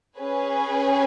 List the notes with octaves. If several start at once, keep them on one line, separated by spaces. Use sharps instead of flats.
C#4 G#4 B4 G#5